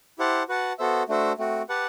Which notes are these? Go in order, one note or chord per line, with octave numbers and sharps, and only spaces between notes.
E4 G4 C5 F#5 A5
F#4 B4 F#5 A5
B3 F#4 A4 C5 E5
A3 D4 F#4 C5 E5
A3 C4 F#4
G4 B4 F#5 A5